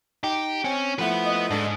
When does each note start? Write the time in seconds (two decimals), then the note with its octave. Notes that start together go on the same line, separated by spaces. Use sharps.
0.24 D#4 G4
0.65 C4 C#4
0.99 F3 A3 E4 B4 F#5
1.26 D#5
1.51 G#2 D4 A4